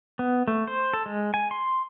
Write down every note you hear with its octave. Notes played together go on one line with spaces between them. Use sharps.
B3
A3
C5
A4
G#3
G#5
C6